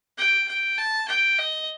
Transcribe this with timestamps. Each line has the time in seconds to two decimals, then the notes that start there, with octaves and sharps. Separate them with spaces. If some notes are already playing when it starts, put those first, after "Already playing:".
0.18 G5
0.48 G5
0.78 A5
1.08 G5
1.38 D#5